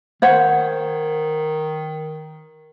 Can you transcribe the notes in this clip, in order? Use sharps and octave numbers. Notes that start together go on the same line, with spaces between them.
D#3 C5 C#5 F#5